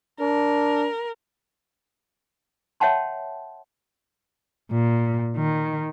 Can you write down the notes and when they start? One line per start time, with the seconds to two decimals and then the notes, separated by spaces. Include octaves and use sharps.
0.20 D4 A#4
2.80 C#5 E5 F#5 G5 A5 C6
4.71 A#2
5.36 D#3